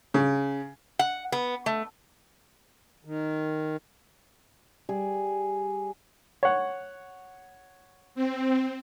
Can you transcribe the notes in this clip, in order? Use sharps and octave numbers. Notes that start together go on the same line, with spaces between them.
C#3
F#5
B3
A3
D#3
G3 G#4
C#5 F#5
C4